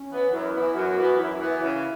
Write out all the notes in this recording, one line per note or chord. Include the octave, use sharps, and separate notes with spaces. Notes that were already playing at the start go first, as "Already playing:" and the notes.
Already playing: C#4
E3 B3
F#2 E4
E3 B3
F#2 F#4
E3 B3
F#2 E4
E3 B3
C#3 E4